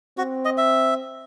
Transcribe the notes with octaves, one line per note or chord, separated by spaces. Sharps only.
C4 F#4
D#5
E5